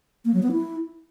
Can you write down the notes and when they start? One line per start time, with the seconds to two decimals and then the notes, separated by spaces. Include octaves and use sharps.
0.25 A#3
0.34 F#3
0.43 B3
0.52 E4